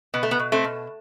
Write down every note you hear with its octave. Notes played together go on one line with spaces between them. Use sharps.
B2 B3
A3
B3
B2
A3 C4
B2